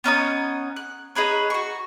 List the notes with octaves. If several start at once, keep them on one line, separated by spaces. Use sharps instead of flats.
B3 C#4 D#4 D#6
F#6
D#4 G#4 B4 C#5
F#4 C#6